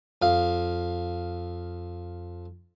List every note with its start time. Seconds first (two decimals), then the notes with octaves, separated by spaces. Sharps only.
0.22 F2 F5